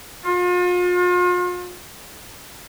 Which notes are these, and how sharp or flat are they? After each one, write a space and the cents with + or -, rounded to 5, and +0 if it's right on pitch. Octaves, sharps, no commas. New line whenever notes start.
F4 +40